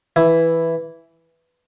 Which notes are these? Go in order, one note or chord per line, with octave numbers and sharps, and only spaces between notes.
E3 E4